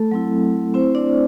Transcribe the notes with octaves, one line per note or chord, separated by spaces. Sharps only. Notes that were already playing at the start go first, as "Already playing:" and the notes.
Already playing: A3 A4
F#3 C4 E4
A3 C4 E4 C5
D4 D5